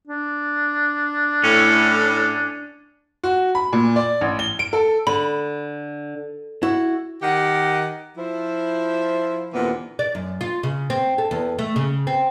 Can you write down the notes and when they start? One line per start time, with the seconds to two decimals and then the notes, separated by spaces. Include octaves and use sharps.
0.07 D4
1.44 A2 C#4
3.24 F#4
3.55 B5
3.73 A#2
3.96 D5
4.21 A1
4.39 G7
4.59 D7
4.73 A4
5.07 D3 B5
6.63 E4 F#4
7.22 D#3 G4 F#5
8.17 F3 E4 C5
9.53 D#2 A#2 D3 E3 B3 C4
9.99 D5
10.15 F#2
10.41 F4
10.63 C#3
10.90 C4
11.18 A4
11.31 E2
11.59 A3
11.76 C#3
12.07 C4